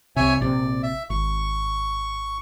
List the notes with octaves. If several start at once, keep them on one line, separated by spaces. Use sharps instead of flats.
C2 C3 C#5 E5 G#5
A#1 C3 D5
E5
G#1 C#6